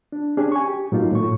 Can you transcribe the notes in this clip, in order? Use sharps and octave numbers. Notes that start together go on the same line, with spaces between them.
D4
C#4 D4 G4 G#4
G#5 C#6
G4
A2 F#3 A#3 D#4 F4
A2 C#6